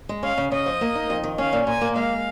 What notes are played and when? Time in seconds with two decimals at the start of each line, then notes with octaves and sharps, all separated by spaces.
0.09 G#3
0.23 C#4 F5
0.38 C#3
0.52 C#3 D#5
0.66 F3
0.81 A#3
0.95 D#4
1.10 F2
1.24 D#3
1.38 C#4 F5
1.53 A#2
1.67 A#2 G#5
1.81 A#3
1.96 G#3 F5